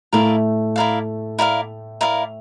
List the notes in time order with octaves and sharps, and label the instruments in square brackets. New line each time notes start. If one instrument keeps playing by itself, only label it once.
[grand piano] A2 A3 [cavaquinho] E4 A#4 D5 F5
[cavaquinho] E4 A#4 D5 F5
E4 A#4 D5 F5
E4 A#4 D5 F5